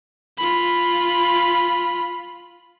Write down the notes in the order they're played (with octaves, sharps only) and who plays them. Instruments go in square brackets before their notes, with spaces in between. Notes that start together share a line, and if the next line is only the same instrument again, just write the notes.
[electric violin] F4 B5